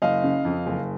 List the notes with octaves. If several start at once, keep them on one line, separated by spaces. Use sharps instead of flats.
F#1 D#5 F5
C#3
F2
F#1